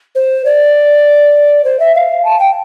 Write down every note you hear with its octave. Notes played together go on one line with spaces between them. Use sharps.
C5
D5
C5
E5
F5
A5
G5